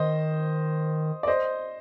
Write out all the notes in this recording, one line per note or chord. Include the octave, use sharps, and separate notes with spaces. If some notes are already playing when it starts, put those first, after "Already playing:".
Already playing: D#3 C5 D#5
D5
C5 D#5